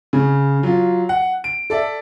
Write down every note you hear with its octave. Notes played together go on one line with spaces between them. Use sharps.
C#3
F#3 F4
F#5
D7
A4 D5 E5